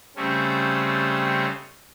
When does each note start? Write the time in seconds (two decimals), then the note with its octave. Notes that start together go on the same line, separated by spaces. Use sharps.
0.16 C#3 G3 A3 C4 C#4